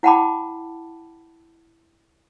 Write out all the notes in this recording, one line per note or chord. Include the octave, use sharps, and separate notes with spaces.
E4 F#5 G5 A5 B5 D6